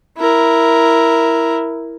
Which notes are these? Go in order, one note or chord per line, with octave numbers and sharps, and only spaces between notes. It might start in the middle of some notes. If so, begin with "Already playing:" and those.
E4 A#4